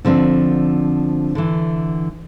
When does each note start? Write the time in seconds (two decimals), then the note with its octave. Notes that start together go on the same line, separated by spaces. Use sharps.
0.05 D3 F3 C4 D4
1.35 D3 E3